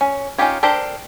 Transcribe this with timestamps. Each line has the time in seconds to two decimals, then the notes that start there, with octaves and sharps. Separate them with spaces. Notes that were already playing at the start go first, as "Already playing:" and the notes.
0.01 C#4
0.38 C#4 D#4 F4 G4 C#5
0.63 D4 G4 A4 A#4 C5